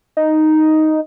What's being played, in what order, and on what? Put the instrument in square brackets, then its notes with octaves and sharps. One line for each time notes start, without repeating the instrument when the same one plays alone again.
[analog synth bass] D#4